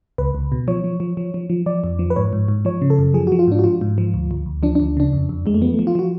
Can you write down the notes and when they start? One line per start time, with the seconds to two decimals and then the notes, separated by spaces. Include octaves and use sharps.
0.18 C#2 B4
0.35 C#2
0.52 B2
0.68 F3 C#5
0.84 F3
1.00 F3
1.17 F3
1.34 F3
1.50 F3
1.66 F3 D5
1.84 F2
1.99 F3
2.10 B4
2.16 G#2 C#5
2.33 G#2
2.48 G#2
2.65 F3 C#5
2.82 C#3
2.90 A4
2.99 F#2
3.14 F3 G#4
3.27 F#4
3.32 F3
3.39 F4
3.47 G#2 D4
3.59 F#4
3.64 F3 F4
3.81 G#2
3.98 F3
4.14 D2
4.31 D2
4.46 D2
4.63 F3 D4
4.75 D4
4.80 D2
4.97 C#3 D4
5.13 F2
5.29 F2
5.46 F2 G#3
5.54 A3
5.62 F3 B3
5.74 A3
5.79 F3
5.87 F4
5.95 F3 F#4